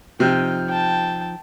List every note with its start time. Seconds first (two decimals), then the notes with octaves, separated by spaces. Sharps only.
0.20 C3 F3 D#4 G5
0.68 G5 A5